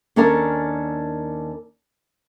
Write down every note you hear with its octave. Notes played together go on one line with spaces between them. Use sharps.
D#2 C#4 D4 A4 A#4 F5